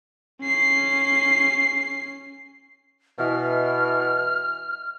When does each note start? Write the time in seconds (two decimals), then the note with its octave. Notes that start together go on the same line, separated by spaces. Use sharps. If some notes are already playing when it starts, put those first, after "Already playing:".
0.41 C#4 C7
3.19 B2 E3 F6